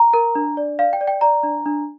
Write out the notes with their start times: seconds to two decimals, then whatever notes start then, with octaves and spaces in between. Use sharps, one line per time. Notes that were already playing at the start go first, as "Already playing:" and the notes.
Already playing: A#5
0.14 A#4
0.35 D4
0.57 D5
0.79 D5 F5
0.93 G5
1.01 D5
1.07 G5
1.21 D5 A#5
1.43 D4
1.66 D4